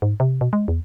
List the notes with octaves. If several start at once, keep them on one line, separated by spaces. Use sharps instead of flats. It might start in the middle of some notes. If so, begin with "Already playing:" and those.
G#2
C3
B2
G#3
E2